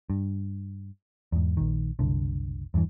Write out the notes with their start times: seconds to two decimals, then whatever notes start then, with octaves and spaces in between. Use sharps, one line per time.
0.10 G2
1.32 E2 G#2
1.57 A#1 D#3
1.99 F#1 C2 D3
2.74 E2 G2 C#3 E3